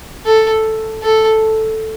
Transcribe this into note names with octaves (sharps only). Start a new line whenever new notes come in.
A4
A4